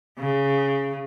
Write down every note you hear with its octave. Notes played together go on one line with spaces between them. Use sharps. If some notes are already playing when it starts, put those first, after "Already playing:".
C#3